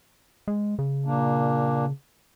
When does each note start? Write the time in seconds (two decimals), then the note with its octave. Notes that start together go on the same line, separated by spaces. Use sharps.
0.48 G#3
0.79 C#3
1.06 A#2 A#3 D4